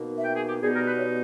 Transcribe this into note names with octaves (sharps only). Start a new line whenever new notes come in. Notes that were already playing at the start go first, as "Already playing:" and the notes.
Already playing: B2 A#3 D#4
E5
G5
G#4
G4
B2 G3 B3 D#4 G#4
A#4
B4
C#5